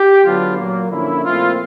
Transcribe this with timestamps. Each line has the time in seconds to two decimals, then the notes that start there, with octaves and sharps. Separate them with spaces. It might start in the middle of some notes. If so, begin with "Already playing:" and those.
Already playing: G4
0.23 D3 F#3 B3 D4 F4
0.57 A#2 F#3 A#3
0.90 D3 F3 A#3 C#4 E4
1.24 A#2 F3 A3 C4 E4 F4